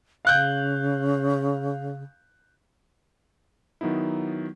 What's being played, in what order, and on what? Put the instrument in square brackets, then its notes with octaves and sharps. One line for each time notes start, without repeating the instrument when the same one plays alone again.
[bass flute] C#3 [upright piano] F5 F#6 G6
[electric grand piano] D#3 F#3 B3 D#4 E4